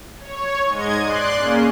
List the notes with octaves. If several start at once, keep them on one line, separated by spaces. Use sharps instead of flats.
C#5
G#2 G#3 D#5 G#6
D5 C6 F#6
A#3 C#4 G#4